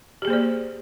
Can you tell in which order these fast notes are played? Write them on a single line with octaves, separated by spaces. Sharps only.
G4 G#4 A#3 C5 D5